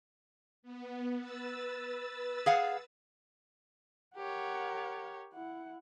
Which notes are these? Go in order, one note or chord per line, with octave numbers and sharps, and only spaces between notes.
B3
B4 E6 A6
G#4 F5 F#5
G4 A#4 C#5 F#5
E4 F#5